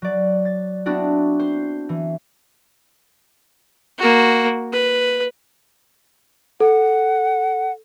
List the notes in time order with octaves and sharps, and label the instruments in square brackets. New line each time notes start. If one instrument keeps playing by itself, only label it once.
[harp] F#3 D5
A6
B3 C4 D4 E4 F#4
C5
E3
[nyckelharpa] A#3 F#4
B4
[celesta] A4 [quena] F#5